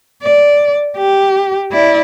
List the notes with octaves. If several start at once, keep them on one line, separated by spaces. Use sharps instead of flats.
D5
G4
E4 D5